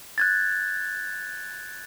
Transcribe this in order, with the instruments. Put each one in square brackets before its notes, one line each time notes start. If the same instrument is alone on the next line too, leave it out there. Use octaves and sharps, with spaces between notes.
[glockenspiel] F#6 G#6 A6